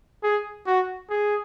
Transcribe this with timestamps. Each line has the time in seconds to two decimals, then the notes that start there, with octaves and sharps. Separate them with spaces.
0.23 G#4
0.66 F#4
1.09 G#4